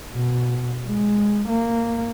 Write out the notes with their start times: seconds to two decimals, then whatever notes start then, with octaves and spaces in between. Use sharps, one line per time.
0.13 B2
0.88 G#3
1.49 A#3